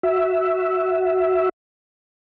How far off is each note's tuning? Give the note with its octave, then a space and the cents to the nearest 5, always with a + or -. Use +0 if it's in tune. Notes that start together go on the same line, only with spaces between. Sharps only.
F#4 +0 E5 +0